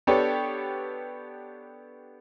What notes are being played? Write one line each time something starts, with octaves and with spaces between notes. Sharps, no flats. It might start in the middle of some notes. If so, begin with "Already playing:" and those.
B3 D4 G4 A4 B4 C#5